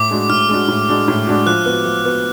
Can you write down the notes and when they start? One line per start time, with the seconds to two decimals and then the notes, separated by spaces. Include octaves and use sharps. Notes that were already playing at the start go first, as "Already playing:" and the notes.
Already playing: A2 D6
0.11 G#3 D4 F#4
0.29 A2 F6
0.49 G#3 D4 F#4
0.68 A2
0.88 G#3 D4 F#4
1.08 A2
1.27 G#3 D4 F#4
1.46 F3 F#6
1.66 B3 F#4
1.86 F3
2.05 B3 F#4